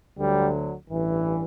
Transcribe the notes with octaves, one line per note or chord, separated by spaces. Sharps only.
D2 D3 F#3 G3
A1 G2 E3